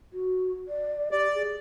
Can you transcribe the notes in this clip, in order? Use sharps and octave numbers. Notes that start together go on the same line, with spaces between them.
F#4
D5
G4 D5
G#4